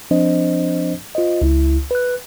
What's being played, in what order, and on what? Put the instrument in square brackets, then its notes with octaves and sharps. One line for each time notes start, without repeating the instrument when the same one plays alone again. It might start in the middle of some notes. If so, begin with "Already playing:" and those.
[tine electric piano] F3 C4 D4 C5 D#5
F4 C5 D#5
C#2 E4
B4 F#6